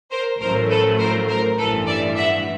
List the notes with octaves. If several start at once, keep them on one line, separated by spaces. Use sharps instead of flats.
A#4 C5
A1 A2 F#3 A3 A#4 C5
A4 B4
A#4 C5
A#4 C5
A1 G2 E3 A4 B4
D5 E5
E5 F#5